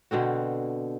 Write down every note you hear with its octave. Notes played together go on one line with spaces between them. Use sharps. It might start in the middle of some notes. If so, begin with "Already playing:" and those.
B2 D3 C4 F#4